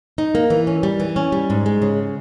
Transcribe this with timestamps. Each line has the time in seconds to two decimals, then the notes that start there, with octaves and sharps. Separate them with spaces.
0.18 D#4
0.35 A#3
0.50 E3
0.67 C#4
0.83 G3
1.00 E3
1.16 C#4
1.32 G3
1.50 G#2
1.66 G#3
1.82 C#3